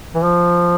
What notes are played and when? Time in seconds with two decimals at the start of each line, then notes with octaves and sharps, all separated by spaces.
0.15 E3
0.23 F3